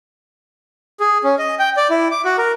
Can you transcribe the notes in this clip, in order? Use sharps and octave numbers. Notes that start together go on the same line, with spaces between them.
G#4
C#4
D#5
G5
D5
E4
D6
F#4
A#4